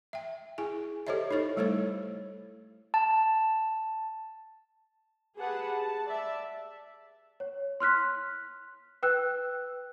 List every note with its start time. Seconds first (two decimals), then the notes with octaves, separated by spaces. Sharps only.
0.13 E5 G5
0.58 E4 G#4 G#5
1.07 G4 A4 C5 C#5 D#5 E5
1.31 D#4 E4 A4 C#5
1.57 G3 A3 E4 A4 C5 C#5
2.94 A5
5.36 G4 G#4 B4 F#5 A5
5.75 A5
6.08 D5 E5 A5
7.40 C#5
7.80 C6 F6 F#6 B6
9.03 B4 G5 E6 F#6